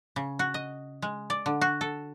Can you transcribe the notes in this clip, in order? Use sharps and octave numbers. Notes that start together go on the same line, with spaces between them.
C#3
F#4
D#5
G#3
D5
D3
F#4
A4